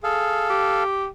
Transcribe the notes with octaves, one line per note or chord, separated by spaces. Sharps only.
G#4 A4 F5
G4